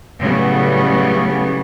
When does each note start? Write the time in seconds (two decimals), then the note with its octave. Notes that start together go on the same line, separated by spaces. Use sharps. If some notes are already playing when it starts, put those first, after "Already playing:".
0.20 A2 C#3 F#3 G3 B3